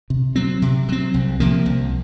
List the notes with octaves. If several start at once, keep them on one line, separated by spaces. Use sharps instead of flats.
C3
F#3 C4
C3
F#3 C4
C2
C3 F3 A#3
C2